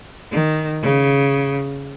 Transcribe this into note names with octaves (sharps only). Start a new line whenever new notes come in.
D#3
C#3